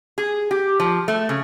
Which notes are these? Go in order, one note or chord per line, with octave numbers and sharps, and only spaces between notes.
G#4
G4
F3
A3
C#3